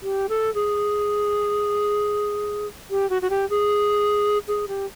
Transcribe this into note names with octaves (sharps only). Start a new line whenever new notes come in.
G4
A4
G#4
G4
F#4
F#4
G4
G#4
G#4
G4